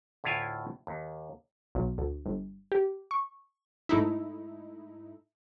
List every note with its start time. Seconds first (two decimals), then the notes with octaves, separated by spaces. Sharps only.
0.24 D2 A2 E4 F4 F5 G#5
0.87 D#2
1.75 B1
1.98 D2
2.26 G1
2.72 G4
3.11 C#6
3.89 G#2 A3 D#4 E4